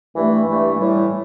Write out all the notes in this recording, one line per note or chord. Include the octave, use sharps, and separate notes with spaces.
G2 E3 A3
G2 E3 A3
A2 E3 G3